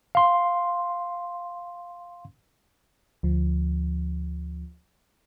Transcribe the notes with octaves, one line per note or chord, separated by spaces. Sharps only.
F5 C6
D2 F3